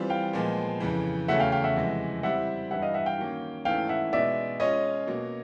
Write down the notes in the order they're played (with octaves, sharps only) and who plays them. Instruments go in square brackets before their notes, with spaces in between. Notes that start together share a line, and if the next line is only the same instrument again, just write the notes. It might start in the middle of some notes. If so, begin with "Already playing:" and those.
Already playing: [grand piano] E3 G3 C4 F4
[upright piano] F5 G5
[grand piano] A#2 F3 G#3 B3
F2 C#3 E3
[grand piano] E2 C#3 F#3 A3 C#4 [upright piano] E5 F#5
[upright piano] F5 G5
F5 G5
E5 F#5
[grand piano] F2 C3 E3 G#3
[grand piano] G3 C4 E4 G4 [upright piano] E5 F#5
[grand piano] G2 E3 G3 [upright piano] E5 F#5
[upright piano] D#5 F5
E5 F#5
F5 G5
[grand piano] D#3 F#3 A#3 C#4
[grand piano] G#2 E3 A3 C#4 E4 [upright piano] F5 G5
[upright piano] E5 F#5
[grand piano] B2 G#3 B3 D#4 [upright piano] D5 E5
[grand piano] G#3 C#4 F4 [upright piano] C#5 D#5
[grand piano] B2 F#3 A#3